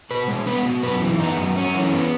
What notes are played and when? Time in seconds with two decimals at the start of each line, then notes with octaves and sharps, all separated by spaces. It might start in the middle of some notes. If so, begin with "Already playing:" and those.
0.11 B2 B4
0.28 G#3
0.46 B3 B4
0.66 B2
0.82 F#2 B4
1.01 E3
1.20 B3 D#4
1.37 F#2
1.55 F#2 C#4
1.75 E3
1.93 B3